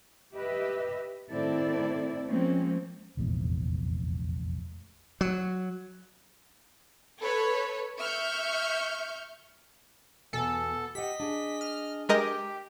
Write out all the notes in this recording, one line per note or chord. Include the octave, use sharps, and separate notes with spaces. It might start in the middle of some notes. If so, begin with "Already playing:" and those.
G4 B4 D#5 E5
A2 D#3 C4 E4 A4 D5
F3 G#3 A#3 C4 C#4
F1 A#1 E2 G#2
F#3
A4 B4 C#5 B5
E5 C#6 F6 G6
E2 B2 B3 A4 G#5
G4 D#5 F#5 B6
D4 G#4
F6
G#3 G4 A#4 D#5